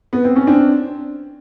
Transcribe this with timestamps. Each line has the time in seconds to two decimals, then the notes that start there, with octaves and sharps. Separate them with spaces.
0.13 B3
0.24 C4
0.36 C#4
0.47 C4 D4